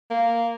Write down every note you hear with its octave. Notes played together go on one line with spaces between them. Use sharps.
A#3